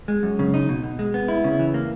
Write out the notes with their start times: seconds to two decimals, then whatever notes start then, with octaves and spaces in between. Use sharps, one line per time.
0.08 G#3
0.23 F#2
0.39 C#3
0.54 D#4
0.69 B2
0.83 B2
0.99 G#3
1.14 B3
1.28 E4
1.44 C#3
1.59 E3
1.74 A#3